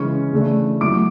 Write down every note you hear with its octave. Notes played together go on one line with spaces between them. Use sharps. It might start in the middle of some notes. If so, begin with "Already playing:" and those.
Already playing: C#3 E3 G#3 C#4 C#6
C#3 E3 A3 D4
F#3 A3 E4 D6 D7